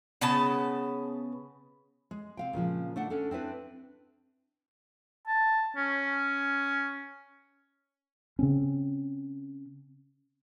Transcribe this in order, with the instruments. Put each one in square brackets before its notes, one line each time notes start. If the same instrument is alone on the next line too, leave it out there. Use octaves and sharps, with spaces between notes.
[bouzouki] C#3 B3 A5
[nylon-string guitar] G#3
C3 F5 G5
A#2 C#3 F3 G#3
A3 D4 F#5
C#4 D4 A4
C4 D4 E4 B4
[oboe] A5
C#4
[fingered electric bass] C#3 C4 C#4